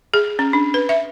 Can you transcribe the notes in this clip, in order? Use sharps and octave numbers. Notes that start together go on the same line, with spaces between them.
G#4
C#4
D4
B4
E5